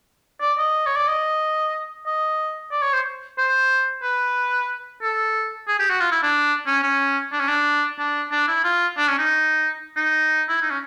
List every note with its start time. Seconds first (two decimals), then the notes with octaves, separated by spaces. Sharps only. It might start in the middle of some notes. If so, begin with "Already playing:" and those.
0.41 D5
0.58 D#5
0.87 C#5
0.96 D5
1.08 D#5
2.06 D#5
2.72 D5
2.82 C#5
2.94 C5
3.38 C5
4.03 B4
5.02 A4
5.68 G#4
5.79 G4
5.90 F#4
6.01 F4
6.12 E4
6.23 D4
6.67 C#4
6.83 C#4
7.32 D4
7.40 C#4
7.48 D4
7.99 D4
8.31 D4
8.48 E4
8.64 F4
8.98 D4
9.09 C#4
9.19 D#4
9.96 D#4
10.49 E4
10.62 D#4
10.71 C#4